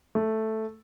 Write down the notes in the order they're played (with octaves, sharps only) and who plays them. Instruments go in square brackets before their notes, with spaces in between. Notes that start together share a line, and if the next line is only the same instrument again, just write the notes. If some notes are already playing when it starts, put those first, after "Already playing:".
[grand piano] A3